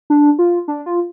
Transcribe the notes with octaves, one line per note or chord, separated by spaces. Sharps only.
D4
F4
D4
F4